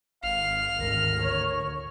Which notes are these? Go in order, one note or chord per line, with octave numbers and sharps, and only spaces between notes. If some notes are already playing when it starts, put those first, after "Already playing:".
G#1 F5 F6
G#1 D2 A#4
C#5